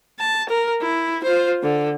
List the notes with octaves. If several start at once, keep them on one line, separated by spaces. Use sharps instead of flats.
A5
A#4
E4
F4 C5
D3